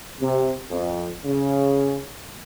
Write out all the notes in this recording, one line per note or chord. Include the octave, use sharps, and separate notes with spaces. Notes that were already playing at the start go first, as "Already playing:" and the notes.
C3
F2
C#3